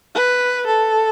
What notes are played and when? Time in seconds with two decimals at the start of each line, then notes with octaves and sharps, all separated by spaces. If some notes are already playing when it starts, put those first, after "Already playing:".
0.15 B4
0.67 A4